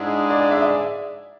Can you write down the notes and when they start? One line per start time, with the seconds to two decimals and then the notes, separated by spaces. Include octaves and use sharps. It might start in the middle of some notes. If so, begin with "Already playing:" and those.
Already playing: G#2 G#3 D4 E4 G#4
0.30 D5
0.41 D5
0.51 E5
0.58 D5
0.62 E5